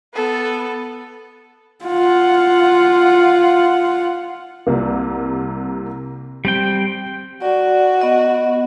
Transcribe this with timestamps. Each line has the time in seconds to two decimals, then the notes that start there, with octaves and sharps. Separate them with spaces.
0.14 B3 A4
1.85 F4 F#5
4.67 C2 C3 A#3
6.45 G3 C4 G5 D7
7.42 F#4 D5
8.01 B3 D#5